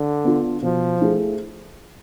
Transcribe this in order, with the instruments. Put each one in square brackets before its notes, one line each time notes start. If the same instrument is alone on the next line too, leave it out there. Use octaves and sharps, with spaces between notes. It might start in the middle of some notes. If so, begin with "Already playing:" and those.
Already playing: [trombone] D3
[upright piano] B3 D4 F4
[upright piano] B2 [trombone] F3
[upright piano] A3 E4 G#4